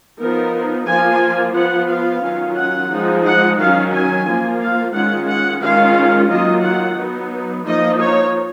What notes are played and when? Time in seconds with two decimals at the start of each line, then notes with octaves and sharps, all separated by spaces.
0.19 F3 B3 D#4 A#4
0.87 F3 A#3 F4 G#5
1.55 F3 B3 F4 F#5
1.89 F5
2.23 D#3 F#3 C#4 F4
2.56 F#5
2.90 F3 G#3 D#4
3.24 F#5
3.58 D#3 F#3 C#4 F5
3.92 G#5
4.27 F3 A#3 F4
4.60 F5
4.94 D#3 G#3 C#4 F4 F#5
5.28 F#5
5.62 D#3 G#3 C#4 F4 F5
6.29 D#3 F#3 A#3 F4 D#5
6.63 F#5
6.98 F#3 B3 D#4
7.65 F3 A#3 D#4 D#5
8.00 C#5